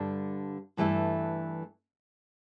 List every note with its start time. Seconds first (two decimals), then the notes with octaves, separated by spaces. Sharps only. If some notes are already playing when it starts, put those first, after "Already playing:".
Already playing: G2 D3 G3 D4 A4
0.77 G2 E3 A3 E4 A4